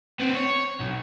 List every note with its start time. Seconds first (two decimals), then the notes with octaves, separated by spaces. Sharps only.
0.20 B3 C4
0.35 C#5
0.80 B1